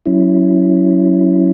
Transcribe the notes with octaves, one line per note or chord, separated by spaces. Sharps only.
F#3 C#4 E4